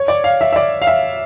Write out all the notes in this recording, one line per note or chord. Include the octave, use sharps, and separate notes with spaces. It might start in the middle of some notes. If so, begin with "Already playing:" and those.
Already playing: C#5
D5
F5
E5
E5
D5
F5
E5